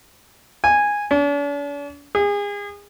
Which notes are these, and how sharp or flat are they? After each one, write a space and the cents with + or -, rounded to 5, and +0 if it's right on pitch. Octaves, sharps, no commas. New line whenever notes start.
G#5 -10
D4 -45
G#4 -30